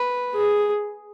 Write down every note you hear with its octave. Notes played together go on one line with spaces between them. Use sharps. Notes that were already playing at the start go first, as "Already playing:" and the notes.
Already playing: B4
G#4